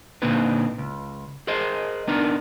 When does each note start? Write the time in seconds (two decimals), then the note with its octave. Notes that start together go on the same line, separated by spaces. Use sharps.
0.22 A#2 D3 A#3 C4 D#4 B4
0.78 C#2
1.47 G#4 A#4 C5 D#5
2.08 B3 D4 D#4 A#4